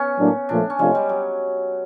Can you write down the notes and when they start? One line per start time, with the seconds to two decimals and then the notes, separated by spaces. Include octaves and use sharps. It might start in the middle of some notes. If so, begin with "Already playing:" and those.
Already playing: B3 C#4
0.19 A2 F#3 A#3 D4
0.49 A#2 F3 A3 D4
0.70 C#4
0.79 C3 F3 G#3 A3 D4 F4
0.95 G3
1.09 F#3